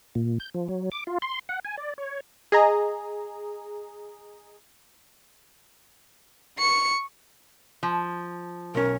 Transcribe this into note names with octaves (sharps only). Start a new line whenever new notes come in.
A#2
G6
F3
F#3
D6
F4
C6
F#5
G#5
D5
C#5
G#4 D#5 A#5
C#6 C#7
F3
B1 C#4 A#4